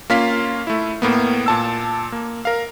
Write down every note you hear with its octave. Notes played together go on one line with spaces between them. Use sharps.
A#3 C#4 F4 F5 B6 C7
A3 E4
A2 A#3 B3
A#2 A5 E6
A#3
A#4 F5